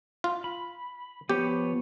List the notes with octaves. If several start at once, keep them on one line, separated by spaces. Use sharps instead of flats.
F4
B5
F3 B3 G4 C#5